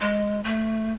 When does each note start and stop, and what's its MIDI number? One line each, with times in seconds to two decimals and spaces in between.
0.01 0.41 56
0.44 0.93 57